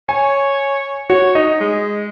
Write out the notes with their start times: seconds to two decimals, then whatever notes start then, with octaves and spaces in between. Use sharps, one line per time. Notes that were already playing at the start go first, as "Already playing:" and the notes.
0.09 C#5 G#5
1.10 F#4 C#5
1.35 D#4 D#5
1.61 G#3